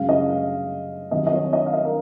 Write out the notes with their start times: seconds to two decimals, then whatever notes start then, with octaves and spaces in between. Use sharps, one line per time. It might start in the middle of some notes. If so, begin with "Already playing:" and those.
Already playing: F#2 C#3 G#3 F5
0.09 D#5
0.29 F5
1.11 C2 C3 D#3 F#3 C4 D#5
1.27 D#5
1.32 C#5
1.53 D#5
1.66 F5
1.74 D#5
1.84 A#4